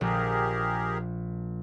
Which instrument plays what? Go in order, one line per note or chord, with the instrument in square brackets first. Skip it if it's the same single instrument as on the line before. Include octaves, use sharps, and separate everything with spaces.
[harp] A#1 [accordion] G4 G#4 A#4